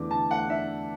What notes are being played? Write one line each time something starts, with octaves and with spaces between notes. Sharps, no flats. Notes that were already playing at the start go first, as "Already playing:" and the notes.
Already playing: E2 D3 A3 D4 D6
D3 A5
A3 F#5
D4 E5